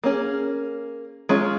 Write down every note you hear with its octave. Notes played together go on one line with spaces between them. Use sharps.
A#3 C#4 G#4
G#3 C#4 F4